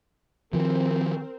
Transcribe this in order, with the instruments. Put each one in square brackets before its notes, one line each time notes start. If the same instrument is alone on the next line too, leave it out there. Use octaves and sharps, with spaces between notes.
[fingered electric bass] D#3 F3 [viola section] C4 A#4